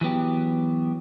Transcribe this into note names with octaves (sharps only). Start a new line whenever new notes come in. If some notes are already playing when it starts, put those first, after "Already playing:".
E3 F#3 B3 G4